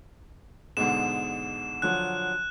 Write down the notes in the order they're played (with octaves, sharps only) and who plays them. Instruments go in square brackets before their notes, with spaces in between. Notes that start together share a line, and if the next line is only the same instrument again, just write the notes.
[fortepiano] G#2 B2 D3 [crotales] E7
[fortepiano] D3 F3 F#3 [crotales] F#6